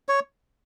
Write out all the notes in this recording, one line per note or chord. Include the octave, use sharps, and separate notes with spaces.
C#5